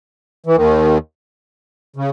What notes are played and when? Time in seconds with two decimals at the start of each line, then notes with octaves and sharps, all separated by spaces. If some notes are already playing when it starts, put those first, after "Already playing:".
0.46 E3
0.56 D#2 D#3
1.96 C#3